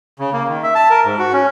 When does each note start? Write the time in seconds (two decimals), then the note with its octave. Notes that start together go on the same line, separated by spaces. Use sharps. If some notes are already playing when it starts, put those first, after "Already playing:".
0.19 C#3
0.33 A#3
0.48 D#3
0.63 E5
0.75 A5
0.90 A#4
1.05 G#2
1.19 F#4
1.33 C#4